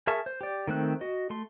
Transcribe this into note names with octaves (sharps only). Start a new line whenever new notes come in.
G#4 A#4 E5 A5 C#6
C5
G4 D5
D#3 A3 C4 F#6
F#4 D#5
A3 C6